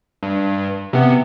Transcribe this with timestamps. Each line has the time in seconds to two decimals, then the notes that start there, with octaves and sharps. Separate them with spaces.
0.23 G2
0.93 C3 B3